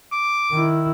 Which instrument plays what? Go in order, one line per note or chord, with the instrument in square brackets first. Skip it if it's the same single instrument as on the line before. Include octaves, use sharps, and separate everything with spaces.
[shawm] D6
[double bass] D#3 E4